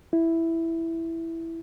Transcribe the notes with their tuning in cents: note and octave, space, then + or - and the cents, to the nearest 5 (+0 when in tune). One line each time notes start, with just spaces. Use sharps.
E4 +0